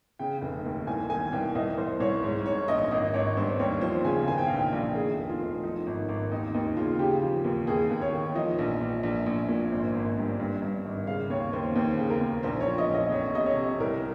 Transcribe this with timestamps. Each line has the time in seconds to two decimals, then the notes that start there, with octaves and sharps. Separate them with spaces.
0.19 C#3 G5
0.41 F1
0.65 D#2
0.87 C2 G#5
1.10 D#3 G#5
1.32 C2 G5
1.55 C2 D#5
1.78 C2 C5
2.00 C2 C#5
2.23 G#2 C#5
2.45 G#2 C#5
2.68 A#1 D#5
2.91 G#1 D#5
3.14 G#1 C#5
3.37 G2 C5
3.59 D#2 C#5
3.81 F3 C5
4.05 C#3 G#5
4.27 D#3 G#5
4.38 G5
4.46 A#1 F5
4.56 G5
4.73 A#1
4.95 D#3 G#4
5.18 F1
5.29 F4
5.40 F1
5.63 F3 D#4
5.86 G#1
6.09 G#1
6.31 D#2 D#4
6.54 D#2 D#4
6.77 C#3 F4
6.99 C#3 G4
7.22 F3
7.44 D#2
7.67 D#2 G#4
7.90 D#2
8.01 C#5
8.12 D#3
8.35 F3 D#5
8.59 A#1
8.81 A#1
9.03 A#1
9.26 A#1
9.49 A#2
9.72 G#1 C5
9.94 G#1
10.17 G2
10.40 G2
10.62 G2
10.85 G#1
11.07 C#3 F5
11.30 D#2 C#5
11.53 D#2 C5
11.75 D#2 C5
11.98 C#3
12.10 A#4
12.20 D#2
12.43 A#1 C5
12.60 C#5
12.66 F3
12.78 D#5
12.89 A#1
12.95 D#5
13.12 F2 C#5
13.34 C3 D#5
13.46 C#5
13.57 C3
13.80 C2 A#4